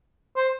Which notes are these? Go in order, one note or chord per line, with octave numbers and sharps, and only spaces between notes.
C5